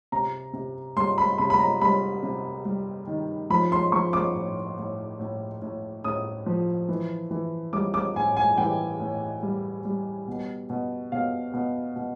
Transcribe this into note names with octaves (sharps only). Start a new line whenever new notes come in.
C3 A#5
C3
G3 C6
B5
C3 B5
B5
A#5
G3 B5
C3
G3
D#3
F3 B5
C6
F3 C#6
D6
A2
A2
A2
A2
A2 D#6
F3
E3
E3
G3 D6
D6
A2 G#5
G#5
E3 G5
A2
G3
G3
B2
B2
B2 F5
B2
B2